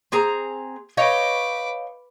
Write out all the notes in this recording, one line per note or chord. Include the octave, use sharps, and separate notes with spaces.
C4 G#4 A#5
B4 C#5 D#5 F5 G5 D6